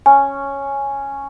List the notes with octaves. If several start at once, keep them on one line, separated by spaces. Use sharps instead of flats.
C#4 G#5